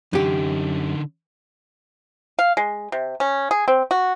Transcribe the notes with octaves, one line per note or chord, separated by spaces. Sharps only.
F#2 D3 D#4 G4
F5
G#3
C3
C#4
G#4
C4
F#4